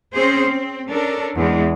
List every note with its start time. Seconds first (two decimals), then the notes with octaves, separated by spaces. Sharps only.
0.13 C4 C#4 G#4 C5
0.47 C4
0.90 C#4 D4 A4 A#4
1.36 E2 G#3